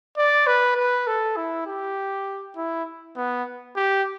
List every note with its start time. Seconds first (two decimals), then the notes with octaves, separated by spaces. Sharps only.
0.17 D5
0.47 B4
0.77 B4
1.07 A4
1.37 E4
1.66 G4
2.57 E4
3.17 B3
3.76 G4